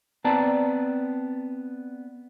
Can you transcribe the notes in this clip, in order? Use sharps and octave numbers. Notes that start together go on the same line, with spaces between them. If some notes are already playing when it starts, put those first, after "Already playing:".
B3 C4 D5 A5 A#5